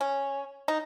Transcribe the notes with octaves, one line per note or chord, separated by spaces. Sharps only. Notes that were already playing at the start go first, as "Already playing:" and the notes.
C#4
D#4